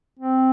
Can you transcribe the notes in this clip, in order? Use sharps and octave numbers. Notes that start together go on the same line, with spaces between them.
C4